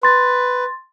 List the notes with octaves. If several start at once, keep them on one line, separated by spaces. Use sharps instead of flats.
B4 C6 A6